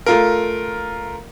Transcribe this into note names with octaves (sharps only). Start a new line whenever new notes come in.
A3 F4 A#4